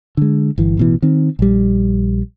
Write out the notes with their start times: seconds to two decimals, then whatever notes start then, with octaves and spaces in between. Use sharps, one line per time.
0.17 D3 G#3
0.58 G1 E3
0.77 A1 B2 E3
1.02 D#3 C4
1.39 A#1 G3